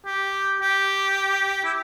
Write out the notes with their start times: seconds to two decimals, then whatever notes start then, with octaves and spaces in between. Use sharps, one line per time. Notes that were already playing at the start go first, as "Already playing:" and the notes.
0.05 G4
0.61 G4
1.64 E4